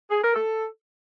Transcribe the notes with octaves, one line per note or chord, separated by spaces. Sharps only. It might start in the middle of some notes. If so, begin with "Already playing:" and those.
G#4
A#4
A4